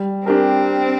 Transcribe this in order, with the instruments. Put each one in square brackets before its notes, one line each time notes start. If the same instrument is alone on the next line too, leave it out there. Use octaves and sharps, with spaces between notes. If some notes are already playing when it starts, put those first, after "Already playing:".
Already playing: [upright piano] G3
[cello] C4 [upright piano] D4 G4 A#4